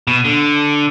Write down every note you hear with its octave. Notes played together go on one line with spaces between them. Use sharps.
B2
D3